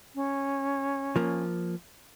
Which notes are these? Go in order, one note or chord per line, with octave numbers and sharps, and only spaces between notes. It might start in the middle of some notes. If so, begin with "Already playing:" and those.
C#4
F3 A#3